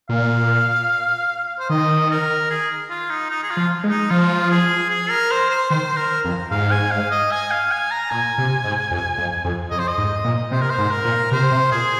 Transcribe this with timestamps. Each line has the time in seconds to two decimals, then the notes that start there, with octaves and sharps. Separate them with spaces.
0.09 A#2 F5
1.59 C5
1.70 D#3 D#5
2.10 A#4
2.50 G#4
2.90 F4
3.10 D#4
3.30 D#4
3.44 G#4
3.50 F4
3.57 F3
3.84 G#3
3.90 D#4
4.10 F3 F4
4.50 G#4
4.90 G#4
5.10 A#4
5.31 C5
5.50 C5
5.70 D#3 C5
5.97 A#4
6.25 F2
6.51 G#2 F5
6.71 G#5
6.91 F5
7.11 D#5
7.31 G#5
7.51 F5
7.71 G#5
7.91 A#5
8.10 A#2 G#5
8.38 C3
8.64 G#2
8.91 F2
9.18 F2
9.45 F2
9.71 F2 D#5
9.79 C5
9.88 D#5
9.98 G#2
10.24 A#2
10.51 C3 C5
10.61 A#4
10.70 C5
10.78 G#2
10.91 A#4
11.05 A#2
11.31 C3 C5
11.51 C3
11.72 A#2 G#4